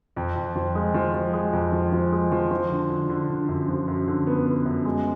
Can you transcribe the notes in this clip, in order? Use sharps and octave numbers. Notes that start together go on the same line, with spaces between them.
F2
F2
F3
G#3
F3
F3
G#3
F2
F3
F3
G#3
F3
F3
D3
D3
D3
D3
F#2
F3
F#2
D3
B3
B3
F#2
G#3